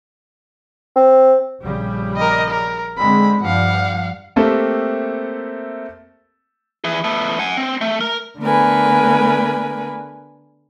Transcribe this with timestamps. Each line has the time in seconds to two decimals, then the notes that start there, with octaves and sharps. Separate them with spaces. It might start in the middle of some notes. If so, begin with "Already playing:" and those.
0.96 C4
1.63 A#1 C#3 G3
2.17 A#4 D#5
2.50 A#4
2.98 D3 G#3 C4 B5
3.41 G2 F3 G3 F5 F#5
4.36 A3 A#3 C4 G4 A4 E5
6.84 E3 G#4
7.04 A3 B3
7.39 F#5 G#5
7.57 C4
7.81 A3
8.01 A#4
8.39 D3 A3 B3 A#4 B4 G#5